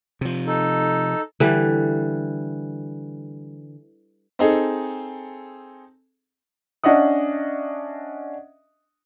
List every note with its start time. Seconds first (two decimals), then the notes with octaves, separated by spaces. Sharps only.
0.21 C3 F3
0.47 D#4 A4
1.40 D3 E3 G3
4.39 C4 D#4 G#4 A4
6.84 C#4 D4 D#5 E5 F#5 D#6